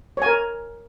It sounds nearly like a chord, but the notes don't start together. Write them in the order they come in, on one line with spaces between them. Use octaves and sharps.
C#5 G#5 A#4